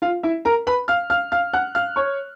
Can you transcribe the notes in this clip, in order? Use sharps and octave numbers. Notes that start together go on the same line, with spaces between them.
F4 F5
E4 E5
A#4 A#5
B4 B5
F5 F6
F5 F6
F5 F6
F#5 F#6
F5 F6
C#5 C#6